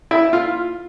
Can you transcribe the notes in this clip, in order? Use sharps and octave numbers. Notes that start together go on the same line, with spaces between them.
E4
F4